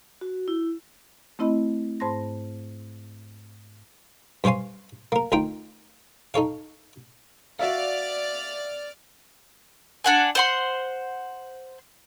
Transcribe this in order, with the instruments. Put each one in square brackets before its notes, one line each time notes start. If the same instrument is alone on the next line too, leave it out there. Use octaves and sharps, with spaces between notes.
[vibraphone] F#4
E4
[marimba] A3 C4 E4 D#5 B5
G#2 C5 A5 B5 C6 A#6
[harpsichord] G2 C5 C#5 F5 G#5 C6
A#3 A#4
D2 D#3 D#4 F4 A#4 G5
D#4 A4 C#5 F5
[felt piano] F#4 E5 F5 [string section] D5 F6
[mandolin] D4 F#5 G#5
C5 F#5 C6